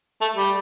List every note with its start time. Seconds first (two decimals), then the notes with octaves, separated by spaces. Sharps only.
0.21 A3
0.36 G3